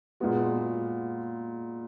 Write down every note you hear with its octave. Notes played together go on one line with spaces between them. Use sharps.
A#2 G#3 B3 F#4